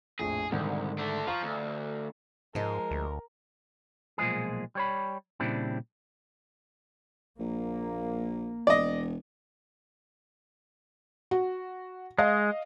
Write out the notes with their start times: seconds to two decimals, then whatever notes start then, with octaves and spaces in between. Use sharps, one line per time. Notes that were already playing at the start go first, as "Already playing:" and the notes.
0.19 A#1 F2 A2 G#4
0.51 C2 G#2 D3 D#3
0.98 A3 D4
1.27 F3 F4 F5 A#5 C#6
1.43 D2
2.55 G#2 F3 G#3 A#4
2.91 D2
4.18 B1 A#2 F3 G#3 G#4
4.75 G3 C#5 B5
5.40 A#2 C#3 G3 C4 D4 E4
7.39 A#1 A#3
8.67 E1 D5 D#5
11.31 F#4
12.18 G#3 D#5 F5